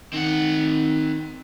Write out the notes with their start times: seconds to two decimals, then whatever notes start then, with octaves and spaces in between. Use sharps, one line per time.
0.13 D#3 C4 F#5